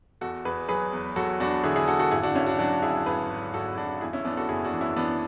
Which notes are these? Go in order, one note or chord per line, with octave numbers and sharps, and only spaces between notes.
E2 F#4 A4
E2 G#4 B4
F#3 G#4 B4
E2
F#3 F#4 A4
E2 D4 F#4
D3 E4 G#4
E4 G#4
D3 F#4 A4
F#4 A4
G#1 E4 G#4
D4 F#4
G#1 C#4 E4
D4 F#4
F#3 D4 F#4
G#1 E4 G#4
G#1 G#4 B4
G#2
G#1 F#4 A4
G#2 D4 F#4
E2 E4 G#4
C#4 E4
E2 B3 D4
F#4 A4
F#1 E4 G#4
D4 F#4
E3
C#4 E4
E3 B3 D4